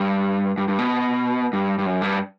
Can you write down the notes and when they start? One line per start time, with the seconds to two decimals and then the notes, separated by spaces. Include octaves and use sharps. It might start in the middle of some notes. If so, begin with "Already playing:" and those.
Already playing: G2
0.58 G2
0.68 G2
0.79 B2
1.53 G2
1.79 G2
1.86 F#2
2.02 G2